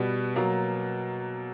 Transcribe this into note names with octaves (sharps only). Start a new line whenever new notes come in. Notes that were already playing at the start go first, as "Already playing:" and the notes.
Already playing: B2 G3 B3
B2 F#3 A#3 A#5